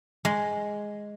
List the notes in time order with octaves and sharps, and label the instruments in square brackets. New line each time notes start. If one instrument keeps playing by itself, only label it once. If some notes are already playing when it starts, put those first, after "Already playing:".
[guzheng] G#3